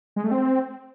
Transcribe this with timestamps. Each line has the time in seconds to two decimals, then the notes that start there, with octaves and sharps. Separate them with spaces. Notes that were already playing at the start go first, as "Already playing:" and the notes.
0.16 G#3
0.24 A3
0.31 C4